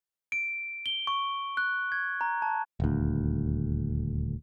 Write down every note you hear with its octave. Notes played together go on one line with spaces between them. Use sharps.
D7
G7
C#6
F#6
G#6
A#5
A5
D#1 D2